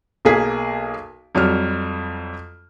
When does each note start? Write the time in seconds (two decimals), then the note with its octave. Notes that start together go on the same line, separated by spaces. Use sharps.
0.25 B1 A#3 G#4 B6
1.35 F2 F#3 G3 F6